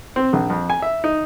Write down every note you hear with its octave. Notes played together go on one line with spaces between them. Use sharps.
C4
A#1
F2
G#5
E5
D#4